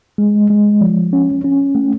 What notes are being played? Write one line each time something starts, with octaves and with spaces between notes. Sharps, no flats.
G#3
G#3
F3
C#4
C#4
A3